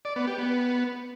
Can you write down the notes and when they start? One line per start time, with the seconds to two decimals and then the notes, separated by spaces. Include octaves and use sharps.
0.05 D5
0.16 B3
0.27 G4
0.38 B3